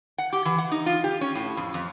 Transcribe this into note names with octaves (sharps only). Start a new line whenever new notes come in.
F#5
G4
E3
F#5
D#4
F4
G4
C#4
A2
F2
F2